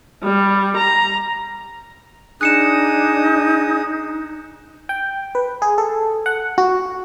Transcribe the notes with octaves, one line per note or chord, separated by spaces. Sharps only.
G3
A#5
D4 D#4 G#4 D#6 F#6 C#7 E7
G5
B4
G#4
A4
F#5
F#4